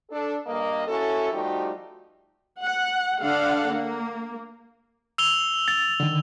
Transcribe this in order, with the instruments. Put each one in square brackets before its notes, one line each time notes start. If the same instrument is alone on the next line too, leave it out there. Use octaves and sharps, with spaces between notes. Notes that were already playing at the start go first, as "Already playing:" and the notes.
[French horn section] D4 A4
G2 A#3 D#5
C#4 E4 F#4 A4
F3 G3 A3 D#4 F#4 G4
[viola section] F#5
D3 D4 A4 F5 F#5
A#3
[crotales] E6 F7 G7
[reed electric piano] A6
D3 D#3